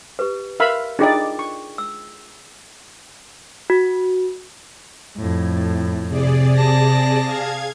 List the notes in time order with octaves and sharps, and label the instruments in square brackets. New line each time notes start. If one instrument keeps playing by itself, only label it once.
[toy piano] G4 B4
[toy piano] A#4 [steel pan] E5 F5 B5
[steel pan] D4 D#4 D5 [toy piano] F4 G#4 G5
[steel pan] C#6
[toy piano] E6
[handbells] F#4
[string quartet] F2 A2
[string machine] C3 G#4 D5
[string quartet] A5 A#6
[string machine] G#4 F5 G#6